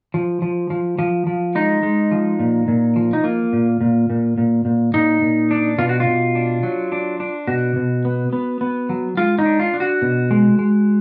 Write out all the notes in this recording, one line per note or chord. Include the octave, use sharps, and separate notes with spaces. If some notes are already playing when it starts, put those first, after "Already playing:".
F3
F3
F3
F3
F3
G#3 D#4
G#3
F3
A#2
A#2
F3
D#4
A#3 F4
A#2
A#2
A#2
A#2
A#2
A#2 D#4
A#2
D4
B2 F4
F#4
F4
B2
D4
F#3
D4
D4
B2 F#4
B2
B3
B3
B3
F#3
G#3 F4
D#4
D4
F4
D4
F#4
B2
G#3
G#3